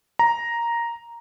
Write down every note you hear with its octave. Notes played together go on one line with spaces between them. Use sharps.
A#5